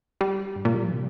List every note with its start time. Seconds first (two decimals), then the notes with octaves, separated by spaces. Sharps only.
0.21 G3
0.56 G2
0.65 A#2
0.74 G3
0.84 F3
0.92 C3